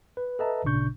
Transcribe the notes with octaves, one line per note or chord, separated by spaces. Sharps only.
B4
A4 B4 D#5 E5 A5 A#5
G#1 A#2 C#3 D4 C#6 G6